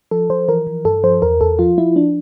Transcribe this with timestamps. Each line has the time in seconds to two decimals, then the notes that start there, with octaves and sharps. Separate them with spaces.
0.11 F3 A4
0.30 F3 C5
0.48 E3 A#4
0.67 E3
0.85 G2 A4
1.04 F3 C5
1.22 E2 A#4
1.41 E2 A4
1.59 F3 F4
1.78 F3 E4
1.96 F3 D4